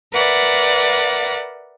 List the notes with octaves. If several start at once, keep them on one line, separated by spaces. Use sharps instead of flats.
A#4 B4 D5 E5 F#5